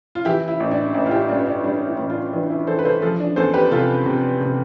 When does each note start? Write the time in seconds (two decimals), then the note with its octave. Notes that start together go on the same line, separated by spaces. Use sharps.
0.15 F4
0.25 E3 E4 G4
0.48 E4
0.60 A1
0.71 D4
0.94 A1 E4
1.06 F4
1.11 E4 G4
1.29 G2 D4 F4
1.47 D4
1.63 G3 D4
1.87 E4
1.99 A1
2.10 D4 F4
2.33 E3 D4
2.50 E4
2.67 E3 A4 C5
2.79 B4
2.85 A4 C5
3.02 F3 F4 A4
3.20 D4
3.36 E2 A4 C5
3.54 G4 B4
3.71 C3 F4 A4
4.06 C3
4.41 C3